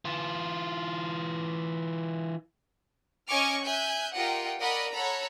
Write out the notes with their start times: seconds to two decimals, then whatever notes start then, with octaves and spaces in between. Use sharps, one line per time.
0.05 E3 F4
3.28 C#4 D#5 G#5 C#6 D6 F6
3.65 E5 G#5 F#6 G6
4.14 F4 G4 A#4 D#5 F#5 G5
4.59 A#4 D5 D#5 F#5 B5
4.93 A4 C#5 F#5 A#5 B5